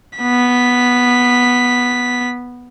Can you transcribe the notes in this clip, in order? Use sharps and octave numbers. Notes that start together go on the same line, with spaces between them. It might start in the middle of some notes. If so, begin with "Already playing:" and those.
B3 B6